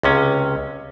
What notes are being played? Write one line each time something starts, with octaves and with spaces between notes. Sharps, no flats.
C#2 C3 C#4